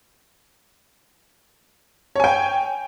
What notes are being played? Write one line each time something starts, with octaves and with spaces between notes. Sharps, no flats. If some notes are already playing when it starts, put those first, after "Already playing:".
C#5 G5 G#5